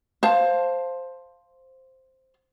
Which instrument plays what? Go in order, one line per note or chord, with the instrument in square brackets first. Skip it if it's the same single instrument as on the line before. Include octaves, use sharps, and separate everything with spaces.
[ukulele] C5 F5 A5